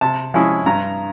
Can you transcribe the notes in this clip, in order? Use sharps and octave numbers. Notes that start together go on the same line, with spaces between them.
C3 A5
F3 G#3 C#4 E4
G2 A#5